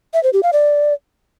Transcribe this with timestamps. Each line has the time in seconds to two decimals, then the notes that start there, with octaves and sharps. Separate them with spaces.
0.14 E5
0.23 C5
0.33 G4
0.43 F5
0.53 D5